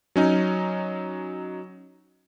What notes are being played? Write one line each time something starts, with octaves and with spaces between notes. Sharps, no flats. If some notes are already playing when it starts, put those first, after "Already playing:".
F#3 C#4 D#4